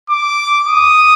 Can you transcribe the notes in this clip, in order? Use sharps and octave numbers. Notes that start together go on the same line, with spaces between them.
D6
D#6